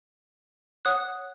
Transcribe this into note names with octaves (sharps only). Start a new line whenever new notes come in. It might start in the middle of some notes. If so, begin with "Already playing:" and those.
C#5 F#5 D#6 F#6